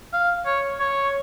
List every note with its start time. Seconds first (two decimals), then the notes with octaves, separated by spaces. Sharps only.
0.13 F5
0.46 C#5
0.80 C#5